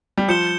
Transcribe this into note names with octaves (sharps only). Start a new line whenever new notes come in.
G3
F3 G6 C#7 E7 G7